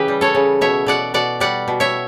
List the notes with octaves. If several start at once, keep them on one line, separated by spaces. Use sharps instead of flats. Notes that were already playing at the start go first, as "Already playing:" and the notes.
Already playing: C#3 E3 G4 B4
G3
A4 C#5
C#3
B2 C#5 E5
B2 D5 F#5
B2 D5 F#5
G3 D5 F#5
B2
C#5 E5